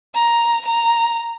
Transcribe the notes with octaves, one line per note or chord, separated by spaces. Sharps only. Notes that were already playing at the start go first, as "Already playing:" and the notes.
A#5
A#5